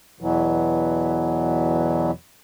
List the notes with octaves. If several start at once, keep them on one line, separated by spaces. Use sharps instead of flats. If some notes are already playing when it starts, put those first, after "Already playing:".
E2 B2 E3 F#3